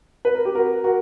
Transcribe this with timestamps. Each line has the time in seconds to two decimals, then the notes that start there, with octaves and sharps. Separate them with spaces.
0.25 B4
0.35 A#4
0.45 G4
0.55 F#4 A#4
0.84 F#4 A#4